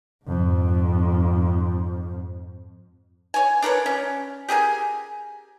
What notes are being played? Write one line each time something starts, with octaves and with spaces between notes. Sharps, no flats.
F2 G#2
C#5 G#5
D4 A#4 B4 C#5
C#4
G4 G#4 A#4 G#5